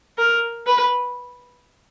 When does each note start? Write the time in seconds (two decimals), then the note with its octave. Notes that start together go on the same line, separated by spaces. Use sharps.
0.18 A#4
0.66 B4